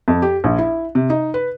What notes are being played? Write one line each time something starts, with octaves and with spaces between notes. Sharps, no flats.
F2
G4
A#1
E4
C3
D#4
B4